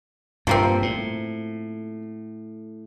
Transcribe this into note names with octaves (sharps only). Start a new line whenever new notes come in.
G2 A#2 F3 A#3 C4
A2